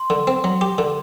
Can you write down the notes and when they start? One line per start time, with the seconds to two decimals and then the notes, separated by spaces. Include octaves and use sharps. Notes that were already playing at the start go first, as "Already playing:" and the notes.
Already playing: C6
0.10 D3
0.27 C4
0.44 F#3
0.61 G4
0.78 D3